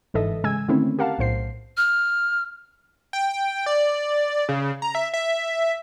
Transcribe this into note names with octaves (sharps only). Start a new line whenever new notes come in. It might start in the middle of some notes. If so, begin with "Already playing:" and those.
G1 G#2 E3 A4 D#5 E5
C#3 G#3 G#5 E6 G#6
D3 D#3 A3 C4 C#4 E4
G4 A#4 F5 F#5 A5
B1 A2 C5 C7
F6
G5
D5
C#3
A#5
E5
E5